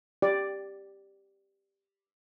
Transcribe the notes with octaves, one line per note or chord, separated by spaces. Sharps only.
G4 D5